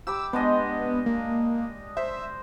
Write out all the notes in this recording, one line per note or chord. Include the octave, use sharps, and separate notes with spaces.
G4 B5 D6 E6
G#3 B3 D4 D#5
A#3
C5 E5